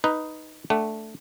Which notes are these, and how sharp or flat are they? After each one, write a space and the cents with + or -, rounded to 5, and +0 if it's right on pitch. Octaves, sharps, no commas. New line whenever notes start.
D#4 +0 B4 +0
A3 +0 D4 +0 F#5 +40